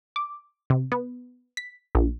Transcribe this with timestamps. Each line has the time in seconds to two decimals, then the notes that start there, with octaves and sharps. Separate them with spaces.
0.16 D6
0.70 C3
0.92 B3
1.57 B6
1.95 A#1